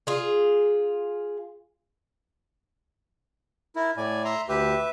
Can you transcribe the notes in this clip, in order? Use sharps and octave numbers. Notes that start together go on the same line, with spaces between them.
F4 G#4
E4 A#4
A2 D5 G#5
E5 A#5 C6
D2 G4 B4 E5